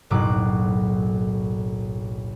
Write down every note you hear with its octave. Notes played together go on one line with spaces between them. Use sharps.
F#1 B1 A2 F#3 D6 F#6